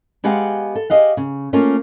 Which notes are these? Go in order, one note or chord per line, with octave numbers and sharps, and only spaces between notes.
G#3 B3 G4 G#4 F5 F#5
A4
G4 G#4 D#5 F5 F#5
C#3
A3 A#3 C#4 F4